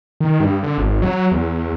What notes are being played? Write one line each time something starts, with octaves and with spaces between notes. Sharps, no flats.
D#3
G2
D3
G#1
F#3
E2